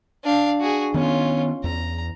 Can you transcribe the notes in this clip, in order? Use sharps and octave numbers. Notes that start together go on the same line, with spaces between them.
D4 F5
F#4 G#4
D#3 B3 C#4 F4
E2 A#5